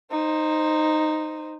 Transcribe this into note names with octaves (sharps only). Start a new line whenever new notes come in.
D#4 C5